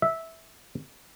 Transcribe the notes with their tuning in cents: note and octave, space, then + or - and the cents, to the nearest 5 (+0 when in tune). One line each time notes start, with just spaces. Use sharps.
E5 -10